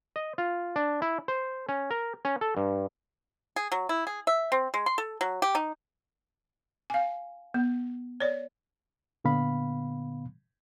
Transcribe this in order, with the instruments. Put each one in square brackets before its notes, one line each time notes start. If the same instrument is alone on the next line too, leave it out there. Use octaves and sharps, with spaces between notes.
[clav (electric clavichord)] D#5
F4
D4
E4
C5
C#4
A#4
C#4
A4
G2
[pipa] G#4
F#3
E4
G#4
E5
C4
G#3
C6
A4
F#3
G4
D#4
[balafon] F5 G#5
B3
C#5 D5
[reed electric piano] A#2 D3 B3 F5 B5